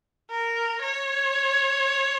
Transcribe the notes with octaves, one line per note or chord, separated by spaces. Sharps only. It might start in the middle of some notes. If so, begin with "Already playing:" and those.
A#4
C#5